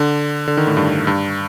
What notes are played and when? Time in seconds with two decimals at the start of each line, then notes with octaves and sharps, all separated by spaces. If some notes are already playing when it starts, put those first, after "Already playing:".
Already playing: D3
0.48 D3
0.57 D#3
0.67 A2
0.77 G2
1.07 G2